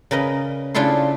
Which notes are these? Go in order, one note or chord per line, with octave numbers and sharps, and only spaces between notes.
C#3 A#4 B4 D#5
C#3 D4 E4 F4 A4 C6